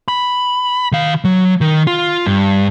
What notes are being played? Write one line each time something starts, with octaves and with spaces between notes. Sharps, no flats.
B5
D#3 F5
F#3
D#3
F4
G2